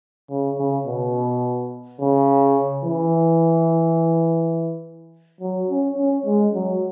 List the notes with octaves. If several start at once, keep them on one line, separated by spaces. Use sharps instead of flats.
C#3
C#3
B2
C#3
E3
F#3
C#4
C#4
G#3
F#3